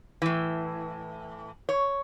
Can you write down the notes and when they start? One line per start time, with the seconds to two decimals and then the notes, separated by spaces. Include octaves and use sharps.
0.22 A2 E3
1.69 C#5